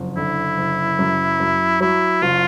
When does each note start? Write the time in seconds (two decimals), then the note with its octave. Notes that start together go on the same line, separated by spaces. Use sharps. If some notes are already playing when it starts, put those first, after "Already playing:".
Already playing: F#1 F2
0.17 D3 E4
0.58 F#1
0.99 F#2
1.40 F#2
1.81 F#3 E4
2.22 F#1 F4